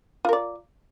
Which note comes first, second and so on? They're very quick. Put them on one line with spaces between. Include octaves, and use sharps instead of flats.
F4 A#4 D5